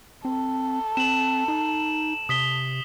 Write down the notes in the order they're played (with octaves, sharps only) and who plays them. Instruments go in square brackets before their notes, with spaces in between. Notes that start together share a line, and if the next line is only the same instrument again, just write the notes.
[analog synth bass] C4 [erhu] A4
[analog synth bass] C4 [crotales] E7 F#7
[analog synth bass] D#4
[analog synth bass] C3 [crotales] D#6 B6 G7